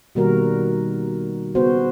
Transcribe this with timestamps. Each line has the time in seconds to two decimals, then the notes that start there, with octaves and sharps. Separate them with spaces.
0.15 B2 D#3 G3 A#3 F#4 A#4
1.55 C#3 B3 F#4 C5